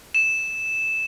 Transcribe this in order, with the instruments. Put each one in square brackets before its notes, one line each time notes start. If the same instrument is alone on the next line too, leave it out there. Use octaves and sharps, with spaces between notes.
[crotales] E7